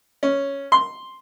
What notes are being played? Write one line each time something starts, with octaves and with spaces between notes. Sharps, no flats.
C#4
C6